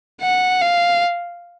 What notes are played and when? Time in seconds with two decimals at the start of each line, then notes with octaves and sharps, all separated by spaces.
0.21 F#5
0.61 F5